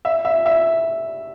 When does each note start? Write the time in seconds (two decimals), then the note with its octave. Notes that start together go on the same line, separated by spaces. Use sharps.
0.05 E5
0.25 E5
0.46 E5